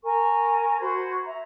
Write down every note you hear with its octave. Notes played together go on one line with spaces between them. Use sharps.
A#4 G#5 C#6
F#4 C5 B5 G#6
E5 A#5